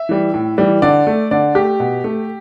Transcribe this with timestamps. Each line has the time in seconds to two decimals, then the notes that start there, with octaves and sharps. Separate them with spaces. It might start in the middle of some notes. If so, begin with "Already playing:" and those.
Already playing: E5
0.09 E3 G3
0.34 A2
0.58 E3 G3
0.82 D3 D5
1.07 A3
1.31 D3 D5
1.55 A3 G4
1.80 B2
2.04 A3